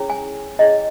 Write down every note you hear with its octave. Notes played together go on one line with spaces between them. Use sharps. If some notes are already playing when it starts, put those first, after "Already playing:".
Already playing: C#4 E4 G#4 C#5
G#5
C#4 E4 G#4 C#5 D#5